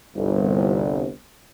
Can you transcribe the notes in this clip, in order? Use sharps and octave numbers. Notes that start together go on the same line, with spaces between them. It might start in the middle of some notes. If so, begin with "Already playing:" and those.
G1 C2